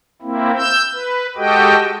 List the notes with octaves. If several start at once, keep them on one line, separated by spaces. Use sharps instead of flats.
A#3 C4 E4
E6 G6
B4
G#3 F#4 G4 A4 D#5 G5